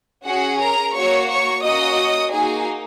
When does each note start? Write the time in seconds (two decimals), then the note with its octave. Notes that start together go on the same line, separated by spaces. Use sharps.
0.25 C#4 F#4 G#4 F#5
0.60 A#4 A#5
0.95 A#3 F#4 C#5 C#6
1.29 C#5 C#6
1.64 A#3 C#4 F#4 D#5 D#6
2.32 A#3 D#4 F#4 G#4 G#5